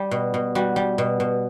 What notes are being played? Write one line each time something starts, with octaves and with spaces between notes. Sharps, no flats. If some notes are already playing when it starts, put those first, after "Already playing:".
Already playing: G3
B2
B2
G3 F#4
G3
B2
B2